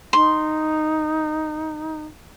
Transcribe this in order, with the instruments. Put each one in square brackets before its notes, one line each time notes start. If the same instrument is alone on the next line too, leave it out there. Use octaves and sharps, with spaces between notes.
[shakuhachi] D#4 [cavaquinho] C6